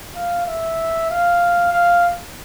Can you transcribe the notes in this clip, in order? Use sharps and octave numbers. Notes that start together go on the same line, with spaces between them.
F5
E5
F5
F5